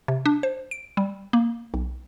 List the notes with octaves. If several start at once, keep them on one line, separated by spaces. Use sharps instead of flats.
C3
D4
C5
D7
G3
A#3
B1